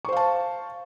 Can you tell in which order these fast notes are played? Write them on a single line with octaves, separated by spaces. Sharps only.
C#6 C5 F5 A5